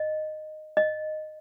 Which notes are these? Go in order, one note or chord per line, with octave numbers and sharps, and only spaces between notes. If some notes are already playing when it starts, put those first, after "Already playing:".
Already playing: D#5
D#5